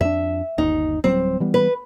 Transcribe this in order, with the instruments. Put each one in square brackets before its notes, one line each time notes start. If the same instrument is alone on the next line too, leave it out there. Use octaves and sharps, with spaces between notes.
[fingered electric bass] F2 D4 [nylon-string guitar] E5
[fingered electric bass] G1 D#2 [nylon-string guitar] D#4
[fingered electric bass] D1 F#3 G3 [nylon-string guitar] C4
[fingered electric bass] E3 G3 B3
[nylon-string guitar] B4